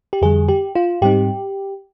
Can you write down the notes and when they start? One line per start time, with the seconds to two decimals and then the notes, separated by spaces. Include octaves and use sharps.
0.13 G4
0.21 F2 D3 G3 G#4
0.49 G4
0.75 F4
1.02 G#2 G3 C4 D#4 G4